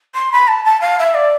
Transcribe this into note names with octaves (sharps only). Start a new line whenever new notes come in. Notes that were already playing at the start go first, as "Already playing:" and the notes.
C6
B5
A5
A5
F5
E5
D5